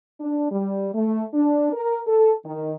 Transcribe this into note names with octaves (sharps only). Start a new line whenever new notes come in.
D4
G3
A3
D4
A#4
A4
D#3